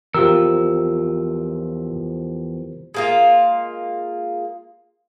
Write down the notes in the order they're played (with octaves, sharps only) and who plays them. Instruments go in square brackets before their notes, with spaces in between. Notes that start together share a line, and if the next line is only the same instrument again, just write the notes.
[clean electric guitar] E2 F3 [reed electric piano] F4 G4 A#4 [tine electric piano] E6
[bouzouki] G#3 A#3 F4